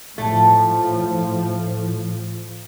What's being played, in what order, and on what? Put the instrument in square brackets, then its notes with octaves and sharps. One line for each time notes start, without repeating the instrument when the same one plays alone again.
[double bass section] A2 F3 [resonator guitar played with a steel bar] A3